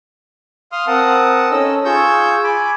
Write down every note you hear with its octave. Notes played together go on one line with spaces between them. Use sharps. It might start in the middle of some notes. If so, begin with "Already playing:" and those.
F5 C6 D#6 F6
C4 A#4 F#5 A5 D#6
C#4 D#4 A4 D#5 E6
F4 G#4 C#6 E6 G6
G#5 B5 D6